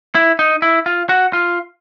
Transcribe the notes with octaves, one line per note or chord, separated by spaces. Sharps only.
E4
D#4
E4
F4
F#4
F4